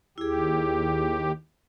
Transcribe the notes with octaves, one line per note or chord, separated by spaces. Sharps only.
D#2 E4 G4 G#4